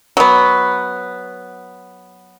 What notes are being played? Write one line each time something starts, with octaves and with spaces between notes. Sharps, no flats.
F#3 B3